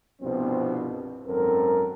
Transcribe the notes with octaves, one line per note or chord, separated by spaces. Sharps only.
C2 G2 B2 F3 B3 C4
G#1 F#2 C4 A4 A#4